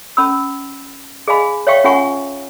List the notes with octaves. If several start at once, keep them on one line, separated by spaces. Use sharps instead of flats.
C#4 B5 E6
G#4 D#5 F5 G#5 B5
C#5 E5 F5 G5 C#6
C#4 F4 F#5 G#5 C#6